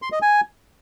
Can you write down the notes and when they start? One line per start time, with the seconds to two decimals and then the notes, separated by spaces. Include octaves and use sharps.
0.02 C6
0.12 D#5
0.22 G#5